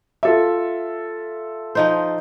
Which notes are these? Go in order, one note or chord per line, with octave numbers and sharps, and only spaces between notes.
F4 A4 E5
F3 D#4 C5